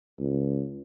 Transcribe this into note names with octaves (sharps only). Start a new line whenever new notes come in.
C#2